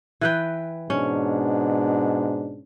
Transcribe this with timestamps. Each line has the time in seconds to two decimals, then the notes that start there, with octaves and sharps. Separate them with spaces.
0.21 E3 B4 G5
0.90 G#2 B2 C#4 D4